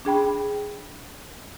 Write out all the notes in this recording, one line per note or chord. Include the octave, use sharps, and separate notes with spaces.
D4 G#4 G5 B5